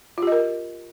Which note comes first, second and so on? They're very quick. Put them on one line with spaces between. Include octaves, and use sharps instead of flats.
F4 G4 D#5 A#4